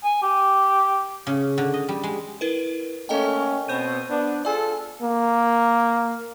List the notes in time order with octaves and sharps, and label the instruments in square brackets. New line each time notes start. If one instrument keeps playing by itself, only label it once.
[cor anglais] G#5
G4
[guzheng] C#3
D3
D#5
G3
G#3
[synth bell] E4 A#4 B4
[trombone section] A3 A#3 C#4 [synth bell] A4 D#5 G5
[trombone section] B2 C4 [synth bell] C5 G6 D#7
[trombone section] B3 D4
[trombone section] F4 G#4 A4 [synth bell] D5 G#5
[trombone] A#3